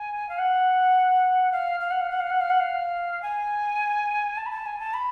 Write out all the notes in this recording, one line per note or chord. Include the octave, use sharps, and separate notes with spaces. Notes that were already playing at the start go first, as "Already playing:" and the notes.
Already playing: G#5
F5
F#5
F5
F5
F#5
F5
F#5
F5
F#5
F5
F#5
F5
G#5
A5
B5
A5
G#5
A5
B5